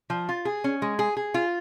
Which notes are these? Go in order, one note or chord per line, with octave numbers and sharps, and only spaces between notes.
F3
F4
G#4
C#4
G#3
G#4
G#4
F4